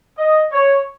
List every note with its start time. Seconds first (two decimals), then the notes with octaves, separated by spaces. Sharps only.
0.17 D#5
0.52 C#5